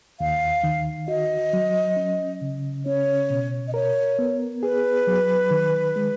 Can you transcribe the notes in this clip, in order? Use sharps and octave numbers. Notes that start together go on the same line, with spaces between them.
D#2 F5
D#3
F#4 D#5
F#3
C#4
C#3
C#4 C#5
B2
D#5
A#4 C#5
B3
G#4 B4
F#3
D#3
G#3